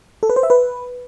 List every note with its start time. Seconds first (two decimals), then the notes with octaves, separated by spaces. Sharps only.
0.23 A4
0.30 B4
0.36 C5
0.43 E5
0.50 B4